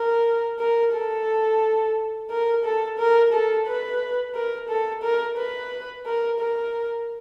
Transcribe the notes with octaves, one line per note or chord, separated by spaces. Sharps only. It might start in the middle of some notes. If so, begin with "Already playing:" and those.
Already playing: A#4
A#4
A4
A#4
A4
A#4
A4
B4
A#4
A4
A#4
B4
A#4
A#4